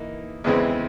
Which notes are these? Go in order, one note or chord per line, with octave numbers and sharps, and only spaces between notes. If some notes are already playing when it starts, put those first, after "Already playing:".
Already playing: E3 A#3 D#4
E2 C#3 E3 G#3 C4